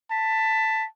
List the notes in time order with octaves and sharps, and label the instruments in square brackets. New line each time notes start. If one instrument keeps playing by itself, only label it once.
[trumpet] A5 [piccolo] B6